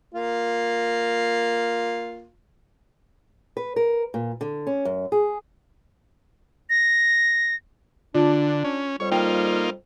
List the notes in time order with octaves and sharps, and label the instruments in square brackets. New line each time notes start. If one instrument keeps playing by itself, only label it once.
[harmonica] A#3 F4
[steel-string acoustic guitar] B4
A#4
A#2
D3
C#4
F#2
G#4
[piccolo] A#6
[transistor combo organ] D3 [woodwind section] D4 [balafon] F4
[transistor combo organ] C#4
[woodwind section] F2 G3 [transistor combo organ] C#5
[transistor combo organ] A#3 D#4 F4 [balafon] G5